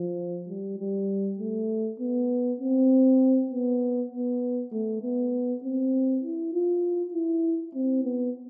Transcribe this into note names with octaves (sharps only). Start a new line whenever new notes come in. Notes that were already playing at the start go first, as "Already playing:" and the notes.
Already playing: F3
G3
G3
A3
B3
C4
B3
B3
A3
B3
C4
E4
F4
E4
C4
B3